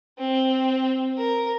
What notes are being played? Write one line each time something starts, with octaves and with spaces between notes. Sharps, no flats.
C4
A#4